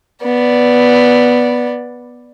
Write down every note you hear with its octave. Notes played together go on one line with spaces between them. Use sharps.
B3 D5